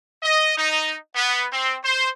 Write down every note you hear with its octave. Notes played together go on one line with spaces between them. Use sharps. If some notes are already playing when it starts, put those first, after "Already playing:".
D#5
D#4
B3
C4
C5